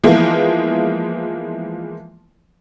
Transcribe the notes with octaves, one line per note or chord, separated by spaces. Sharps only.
E3 F3 G#3 A#3 B3